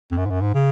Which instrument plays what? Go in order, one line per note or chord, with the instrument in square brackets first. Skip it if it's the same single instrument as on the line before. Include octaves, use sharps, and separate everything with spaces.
[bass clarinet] F2
F#2
G#2
F#2
G#2
C#3